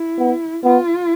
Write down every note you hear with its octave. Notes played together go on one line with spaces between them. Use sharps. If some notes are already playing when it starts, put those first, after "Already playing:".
Already playing: E4
B3
B3 F4